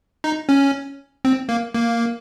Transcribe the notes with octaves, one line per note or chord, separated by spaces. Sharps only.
D#4
C#4
C4
A#3
A#3